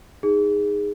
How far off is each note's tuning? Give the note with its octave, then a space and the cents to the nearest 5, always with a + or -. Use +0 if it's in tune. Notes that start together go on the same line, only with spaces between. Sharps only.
D#4 +0 G#4 -15